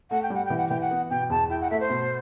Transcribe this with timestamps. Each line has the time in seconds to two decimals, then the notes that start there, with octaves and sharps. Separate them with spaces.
0.11 A3 F#5
0.22 G5
0.30 G3 F#5
0.45 E3 G5
0.58 F#5
0.69 E3 G5
0.81 F#5
0.91 B3
1.10 B2 G5
1.30 E2 A5
1.50 E4 G5
1.61 F#5
1.71 A3 E5
1.80 C5
1.90 B2